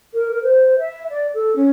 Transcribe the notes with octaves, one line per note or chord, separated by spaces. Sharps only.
A#4
A#4
C5
E5
D5
A4
C#4